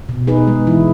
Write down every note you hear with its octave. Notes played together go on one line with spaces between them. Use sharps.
B2
D#4 G#4 B4
G#3
E3 E4